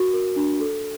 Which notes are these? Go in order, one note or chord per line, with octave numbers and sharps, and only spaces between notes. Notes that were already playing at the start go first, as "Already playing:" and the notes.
Already playing: F#4 A#4
A#4
D4
A4